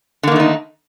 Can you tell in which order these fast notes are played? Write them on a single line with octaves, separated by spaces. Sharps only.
D3 A#3 D#3 A3 D#4